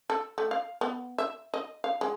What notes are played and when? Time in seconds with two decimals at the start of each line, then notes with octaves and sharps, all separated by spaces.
0.10 A4
0.38 A3
0.51 F5
0.81 B3
1.18 E5
1.54 D#5
1.84 F5
2.01 G#3